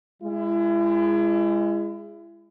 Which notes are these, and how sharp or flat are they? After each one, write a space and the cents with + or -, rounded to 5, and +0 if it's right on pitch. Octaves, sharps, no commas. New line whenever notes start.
G#3 -15 E4 +35